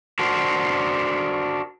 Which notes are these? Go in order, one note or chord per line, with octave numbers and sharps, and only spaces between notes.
D4 F#4 A#4 C5